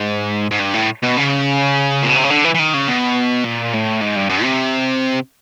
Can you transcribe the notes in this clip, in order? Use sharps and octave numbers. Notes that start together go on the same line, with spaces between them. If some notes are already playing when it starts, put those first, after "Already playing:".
Already playing: G#2
G#2
G2
A2
B2
C#3
A#2
B2
C3
C#3
D3
E3
E3
D#3
C#3
B2
A#2
A2
G#2
G2
F#2
C3